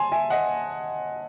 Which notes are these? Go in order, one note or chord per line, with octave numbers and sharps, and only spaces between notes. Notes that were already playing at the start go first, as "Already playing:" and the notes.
Already playing: G#5 A5 C6
E5 G#5
D#5 F#5